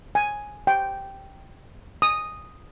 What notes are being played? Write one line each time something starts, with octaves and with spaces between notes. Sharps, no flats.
G#5
G5
D#6